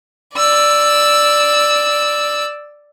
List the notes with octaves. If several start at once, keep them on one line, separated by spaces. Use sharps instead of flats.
D5 E6